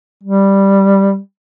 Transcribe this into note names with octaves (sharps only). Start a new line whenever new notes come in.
G3